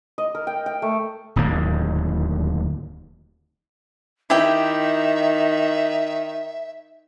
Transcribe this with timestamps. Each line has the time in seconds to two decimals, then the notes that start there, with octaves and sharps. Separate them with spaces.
0.18 D#5
0.35 A#4
0.47 G5
0.66 G5
0.82 A3
1.36 D1 D#2 G#2 A#3
4.30 D#3 E4 G4 E5 G5